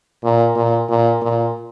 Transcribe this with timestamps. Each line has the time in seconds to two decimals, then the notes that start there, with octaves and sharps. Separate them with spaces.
0.24 A#2
0.56 A#2
0.89 A#2
1.22 A#2